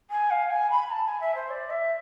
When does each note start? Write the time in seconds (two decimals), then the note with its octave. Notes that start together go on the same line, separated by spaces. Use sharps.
0.10 G#5
0.31 F5
0.50 G#5
0.71 B5
0.91 A5
1.06 G#5
1.21 E5
1.35 C5
1.50 D5
1.70 E5